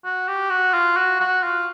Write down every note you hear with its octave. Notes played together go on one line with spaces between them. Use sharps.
F#4
G4
F#4
F4
F#4
F#4
F4